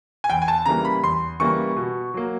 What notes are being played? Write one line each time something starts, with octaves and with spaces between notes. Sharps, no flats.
G#5
E2 G5
G#5
A5
C#3 E3 G3 A#3 A#5
B5
E2 C6
C#3 E3 G3 A#3 C#6
B2
F#3 A#3